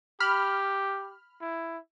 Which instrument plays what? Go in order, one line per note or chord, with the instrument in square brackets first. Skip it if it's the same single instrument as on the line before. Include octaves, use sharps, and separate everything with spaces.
[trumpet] G4 [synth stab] B5 F6
[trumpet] E4